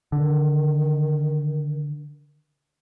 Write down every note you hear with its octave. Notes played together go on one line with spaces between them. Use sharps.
D3 D#3